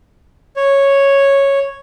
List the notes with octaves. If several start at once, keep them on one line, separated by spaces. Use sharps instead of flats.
C#5